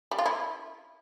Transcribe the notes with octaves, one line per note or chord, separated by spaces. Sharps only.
G3
F4
E4